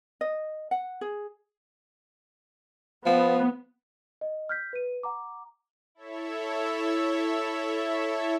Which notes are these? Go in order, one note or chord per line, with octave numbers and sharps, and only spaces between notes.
D#5
F#5
G#4
F3 B3
D#5
F6 G6 B6
B4 D#7
F#5 A#5 D6
E4 A4 C#5 E5